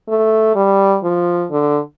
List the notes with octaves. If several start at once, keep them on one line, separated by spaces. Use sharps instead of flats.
A3
G3
F3
D3